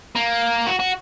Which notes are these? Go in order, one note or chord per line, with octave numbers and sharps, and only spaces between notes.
A#3
F#4
F#4